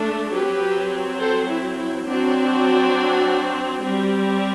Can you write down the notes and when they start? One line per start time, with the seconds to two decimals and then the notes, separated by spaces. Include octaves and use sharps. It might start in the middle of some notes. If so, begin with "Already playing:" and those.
Already playing: A3 D4
0.31 F#3 C4 G4 B4
1.19 A4 C5
1.48 E4
1.77 E4
2.06 F#3 C4 D4 F#4
3.82 G3 C4